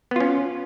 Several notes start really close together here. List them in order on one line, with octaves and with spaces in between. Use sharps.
B3 F4 C#4